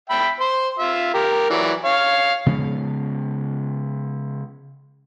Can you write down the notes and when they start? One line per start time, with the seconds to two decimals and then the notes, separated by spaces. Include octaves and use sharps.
0.10 E5 G5 B5
0.40 C5 C6
0.79 F4 E5
1.14 G4 A#4
1.50 E3 F#3 D5
1.84 C#5 F5
2.46 C#3 F3 G#3 B3